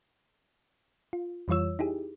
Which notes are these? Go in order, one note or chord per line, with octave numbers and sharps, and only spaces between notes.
F4
F2 E3 G3 F4 C#5 E6
D#4 E4 G4 G#4